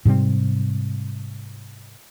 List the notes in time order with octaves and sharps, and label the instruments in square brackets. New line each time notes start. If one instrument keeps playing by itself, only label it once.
[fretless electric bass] G#2 C3 G3 C4